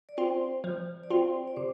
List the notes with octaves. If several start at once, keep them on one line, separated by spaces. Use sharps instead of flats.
D5
C4 F4 C5
F3
D5
C4 F4 C5
D5
C3 C5